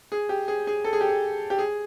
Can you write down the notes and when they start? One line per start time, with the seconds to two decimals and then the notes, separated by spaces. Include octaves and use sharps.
0.12 G#4
0.29 G4
0.48 G#4
0.67 G#4
0.85 A4
0.93 G#4
1.01 G4
1.09 G#4
1.50 G4
1.58 G#4